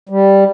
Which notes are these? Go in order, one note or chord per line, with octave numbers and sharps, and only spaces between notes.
G3